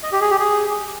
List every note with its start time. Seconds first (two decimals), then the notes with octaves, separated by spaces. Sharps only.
0.03 D#5
0.12 G4
0.21 G#4
0.31 G4
0.40 G#4